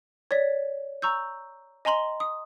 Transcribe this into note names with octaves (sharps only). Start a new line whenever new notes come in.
C#5 D5 B6
A#5 C#6 E6 G6
D#5 G#5 A#5 C6 F#7 G7
D#6